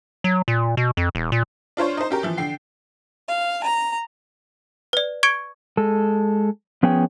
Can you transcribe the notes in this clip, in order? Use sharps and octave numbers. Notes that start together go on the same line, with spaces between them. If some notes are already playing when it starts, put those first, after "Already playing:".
F#3
A#2
B2
F2
E1
A#2
D4 F4 C5 C#5
D#4 C5
C#4 G4 A#4
E3 F3
D3 G5 C7
F5
A#5
B4 D5
C#6 G#6 C#7 D7
G#3 A4
F3 B3 C#4 G#4 C#5 G5